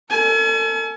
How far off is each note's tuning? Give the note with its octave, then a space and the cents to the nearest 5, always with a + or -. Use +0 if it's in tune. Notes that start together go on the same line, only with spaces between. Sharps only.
A4 +40 G#5 +40